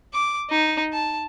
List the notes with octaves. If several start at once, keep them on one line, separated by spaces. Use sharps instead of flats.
D6
D#4
A5